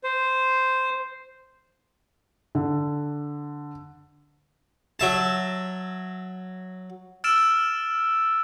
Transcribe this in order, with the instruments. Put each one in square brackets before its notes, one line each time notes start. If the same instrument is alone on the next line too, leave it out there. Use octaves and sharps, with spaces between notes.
[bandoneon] C5
[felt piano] D3
[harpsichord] F#3 E5 A5
[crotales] E6 F6 A6 D7 E7